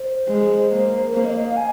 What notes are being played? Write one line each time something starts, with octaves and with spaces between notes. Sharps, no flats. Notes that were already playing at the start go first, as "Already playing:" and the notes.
Already playing: C5
G#3
A#3
A#4
A#3 C5
D#5
D#5
F5
G#5